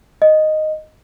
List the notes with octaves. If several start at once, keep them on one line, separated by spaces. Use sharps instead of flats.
D#5